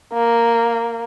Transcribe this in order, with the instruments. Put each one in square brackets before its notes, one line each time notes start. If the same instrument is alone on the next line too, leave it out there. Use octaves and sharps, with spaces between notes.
[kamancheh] A#3